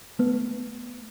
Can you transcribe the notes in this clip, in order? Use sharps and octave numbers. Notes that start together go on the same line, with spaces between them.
A3 B3